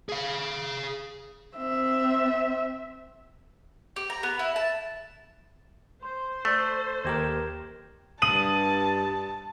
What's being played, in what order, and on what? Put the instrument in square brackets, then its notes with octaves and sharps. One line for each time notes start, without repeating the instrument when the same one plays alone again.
[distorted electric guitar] G#4 F5
[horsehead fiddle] C4 E5
[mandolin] G4
A#5
B3
E4
A5
[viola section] C5 [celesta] C6
[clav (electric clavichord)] A3 [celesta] A4 D5 D#6
[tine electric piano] D#2 G4 A#4 [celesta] G#6 A#6 E7
[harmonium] G2 [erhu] A5 [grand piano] D#6 D#7 F#7